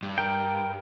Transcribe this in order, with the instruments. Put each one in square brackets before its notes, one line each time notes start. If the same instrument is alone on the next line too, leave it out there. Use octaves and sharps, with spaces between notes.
[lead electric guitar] G2
[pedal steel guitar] A#4 G5